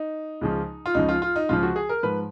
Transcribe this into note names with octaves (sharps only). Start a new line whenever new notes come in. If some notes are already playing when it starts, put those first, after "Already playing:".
Already playing: D#4
C#2 C#3 F3
F4
C#2 C#3 F3 D#4
F4
F4
D#4
C#2 C#3 F3 F4
F#4
G#4
A#4
G#2 F3 B4